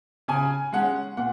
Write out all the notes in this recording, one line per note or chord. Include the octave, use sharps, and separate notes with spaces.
C#3 G#5
G#3 C#4 F#5
A#2 F#5